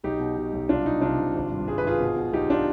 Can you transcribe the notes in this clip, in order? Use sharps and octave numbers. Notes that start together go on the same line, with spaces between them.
B1 D#4 G4
B2
B2
B1
C2 D4 F4
C2 D#4
C3 D4 F4
C3
G#1
G2
G2 G#4
B4
G#1 F4 G#4
B2
B2
B1 D#4 G4
D4 F4